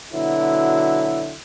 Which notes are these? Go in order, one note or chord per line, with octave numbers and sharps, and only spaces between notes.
B2 D3 F#3 E4